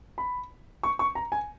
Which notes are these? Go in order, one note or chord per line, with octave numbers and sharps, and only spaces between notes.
B5
C#6
C#6
A#5
G#5